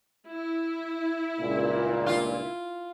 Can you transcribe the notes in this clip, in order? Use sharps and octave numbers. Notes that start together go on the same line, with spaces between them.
E4
C#2 G2 A#2
F4